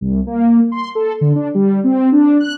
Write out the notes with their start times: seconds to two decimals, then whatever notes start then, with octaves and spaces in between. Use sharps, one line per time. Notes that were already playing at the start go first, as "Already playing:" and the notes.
0.01 C2
0.27 A#3
0.72 C6
0.95 A4
1.21 D3
1.36 D4
1.55 G3
1.84 C4
2.12 D4
2.40 F#6